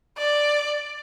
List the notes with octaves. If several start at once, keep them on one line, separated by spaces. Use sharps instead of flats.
D5